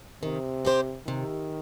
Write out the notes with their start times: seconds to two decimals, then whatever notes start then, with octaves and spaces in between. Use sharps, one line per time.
0.22 C3 D#3
0.65 C4 G4 C5
1.07 C3 D#3